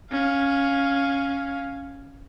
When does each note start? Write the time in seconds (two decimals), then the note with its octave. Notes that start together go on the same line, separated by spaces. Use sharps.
0.12 C#4 F5